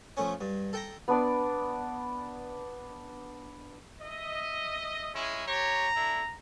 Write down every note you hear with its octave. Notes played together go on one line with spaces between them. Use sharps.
F3 A3 C#4
G2
A4 G5 A#5
B3 D4 D5
D#5 E5
G#3 C#4 E4
G4 C#5 A#5
D4 E4 A4